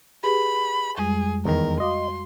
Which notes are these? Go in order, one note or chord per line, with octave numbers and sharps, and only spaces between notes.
G4 G#4 B4 B5
F2 G3 G#3 G#4
E2 D#3 A#4
F#4 D#5 F5 C6 D6